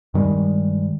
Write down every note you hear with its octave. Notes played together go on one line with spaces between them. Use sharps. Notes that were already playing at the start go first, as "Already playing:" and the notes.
G2 D#3 G3 G#3